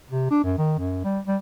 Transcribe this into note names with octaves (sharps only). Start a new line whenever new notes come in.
C3
D4
F#2
D#3
F#2
G3
G3